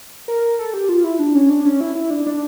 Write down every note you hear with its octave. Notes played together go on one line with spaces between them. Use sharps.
A#4
A4
G4
F4
E4
D4
C#4
D4
C#4
E4
E4
D4
D4